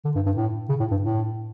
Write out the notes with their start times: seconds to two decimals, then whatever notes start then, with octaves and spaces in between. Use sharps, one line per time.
0.05 D3
0.15 G2
0.26 G2
0.37 A2
0.69 C#3
0.80 A2
0.91 G2
1.02 A2